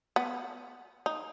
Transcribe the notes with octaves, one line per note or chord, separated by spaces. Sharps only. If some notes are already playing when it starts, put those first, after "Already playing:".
B3
D#4